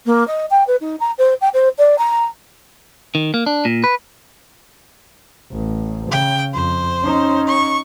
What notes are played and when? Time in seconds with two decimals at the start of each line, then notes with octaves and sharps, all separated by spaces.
0.06 A#3
0.28 D#5
0.51 G5
0.67 B4
0.81 D#4
1.00 A#5
1.18 C5
1.41 G5
1.54 C5
1.78 D5
1.98 A#5
3.15 D#3
3.34 A#3
3.46 D4
3.65 A#2
3.84 B4
5.52 A1
6.11 C#3 G5
6.54 F2 C5
7.04 C#4 D#4
7.48 C#6